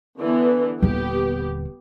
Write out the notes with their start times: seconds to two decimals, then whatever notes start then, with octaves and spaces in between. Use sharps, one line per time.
0.18 D3 E3 B3
0.82 D#1 D3 B3 G4